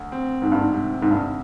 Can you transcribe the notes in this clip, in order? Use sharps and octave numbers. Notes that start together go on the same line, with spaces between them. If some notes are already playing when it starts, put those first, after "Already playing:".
Already playing: D2
C4
D2 G#2
G2
G#2
C3
D2 G#2
G2